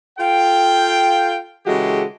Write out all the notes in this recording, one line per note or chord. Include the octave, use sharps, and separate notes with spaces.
F4 A4 F5 G5
C#3 E3 G#3 F#4 G4 A4